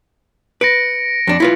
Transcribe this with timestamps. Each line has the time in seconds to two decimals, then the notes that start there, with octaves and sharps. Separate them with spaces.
0.61 B4 A#6 C#7 D7
1.27 F2 D4
1.40 E4 F4 B4